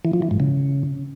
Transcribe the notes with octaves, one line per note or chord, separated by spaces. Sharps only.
E3
F3
E3
G#2
C#3